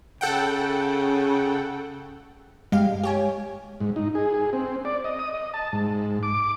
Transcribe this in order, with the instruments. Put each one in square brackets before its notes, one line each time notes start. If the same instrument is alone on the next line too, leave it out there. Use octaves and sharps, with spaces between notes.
[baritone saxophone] C#3 [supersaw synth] A4 F#5 G5
[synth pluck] G2 G4 F5 [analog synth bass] G#3
[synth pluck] G4 C#5 G#5
[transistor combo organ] G#2
D#4
G#4
G#4
C4
D5
D#5
D#6
D#5
A5
G#2
D6